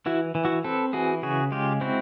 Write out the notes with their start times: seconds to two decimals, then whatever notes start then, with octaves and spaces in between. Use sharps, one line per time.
0.06 E3 E4 F#4
0.35 E3
0.45 E4 F#4
0.64 C4 A4 B4
0.93 E3 F#4 G#4
1.23 C#3 F#4 G#4
1.52 G#3 F4 G4
1.81 C4 E4 F#4